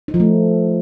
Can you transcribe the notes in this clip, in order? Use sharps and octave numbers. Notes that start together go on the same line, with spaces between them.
D#4
F3
A3